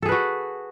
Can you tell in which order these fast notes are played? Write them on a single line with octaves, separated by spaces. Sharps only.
A4 G#4 B4 F#4